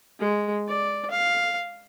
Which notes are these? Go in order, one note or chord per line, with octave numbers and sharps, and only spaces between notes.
G#3
D5
F5